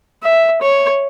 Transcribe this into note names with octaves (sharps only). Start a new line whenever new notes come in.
E5
C#5